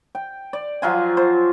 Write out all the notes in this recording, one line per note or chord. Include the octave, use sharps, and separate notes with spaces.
G5
D5
F3 F#3 F4 G#5
C5